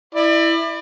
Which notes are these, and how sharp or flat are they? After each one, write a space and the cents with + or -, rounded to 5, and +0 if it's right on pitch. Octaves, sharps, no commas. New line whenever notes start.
E4 +0 D5 +35